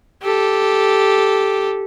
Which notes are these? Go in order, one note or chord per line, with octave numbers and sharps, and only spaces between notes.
G4 A4